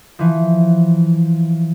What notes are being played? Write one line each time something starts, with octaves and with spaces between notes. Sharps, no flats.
E3 F3